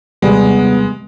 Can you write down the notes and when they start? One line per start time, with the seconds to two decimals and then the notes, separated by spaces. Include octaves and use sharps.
0.22 D#2 C3 G3 G#3 B3